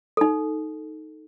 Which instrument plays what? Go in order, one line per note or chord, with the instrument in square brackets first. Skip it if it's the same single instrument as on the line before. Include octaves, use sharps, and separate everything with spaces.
[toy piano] D#4 A4